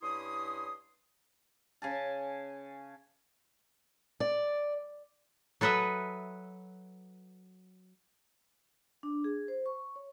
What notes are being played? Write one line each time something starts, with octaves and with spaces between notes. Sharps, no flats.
G2 C#4 E4 C6 D#6
C#3 G#5 A5
D5
F#3 A4 B4 D#5 E5
D4
G#4
C5
C#6
C#5